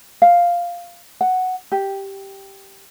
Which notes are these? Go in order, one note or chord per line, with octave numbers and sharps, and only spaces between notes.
F5
F#5
G4